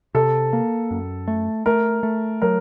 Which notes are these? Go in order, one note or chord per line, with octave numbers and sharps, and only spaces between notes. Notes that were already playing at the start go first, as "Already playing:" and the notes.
C3 A4
A#3
F#2
A3
A3 A#4
A3
F#3 A#4